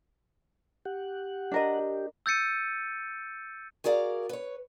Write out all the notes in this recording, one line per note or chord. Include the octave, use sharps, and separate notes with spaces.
G4 F#5
D4 A#4 D#5
G4
E6 G6 A6 C#7 D#7
F#4 G#4 A#4 D5 F5
B4 C#5